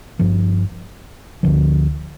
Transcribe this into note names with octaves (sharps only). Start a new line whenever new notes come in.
G1 G2 F3
D2 D3 F3